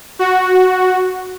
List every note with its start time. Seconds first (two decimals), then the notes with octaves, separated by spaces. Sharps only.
0.19 F#4